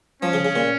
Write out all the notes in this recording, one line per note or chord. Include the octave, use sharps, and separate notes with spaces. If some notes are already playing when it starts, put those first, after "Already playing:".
F3 C#4
C#3
C#3
A#2